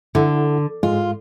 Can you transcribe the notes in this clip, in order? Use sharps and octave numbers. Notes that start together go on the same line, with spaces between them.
D3 E4 A4 F#5
G#2 G#3 F4